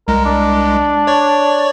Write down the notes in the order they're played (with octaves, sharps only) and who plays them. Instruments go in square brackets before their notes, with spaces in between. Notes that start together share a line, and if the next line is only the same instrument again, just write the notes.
[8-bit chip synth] C2 G#3 [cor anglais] A#4
[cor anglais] D4
[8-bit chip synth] C#5 D5 C#6